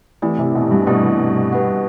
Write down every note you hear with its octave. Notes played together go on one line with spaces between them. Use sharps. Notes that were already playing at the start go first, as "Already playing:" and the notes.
E3 A3 C4 E4 G4 D5
C3
B2
G2
B2 A3 C4 E4 G4 D5
G4 B4 F#5